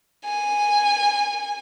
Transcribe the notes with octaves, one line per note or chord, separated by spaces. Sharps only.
G#5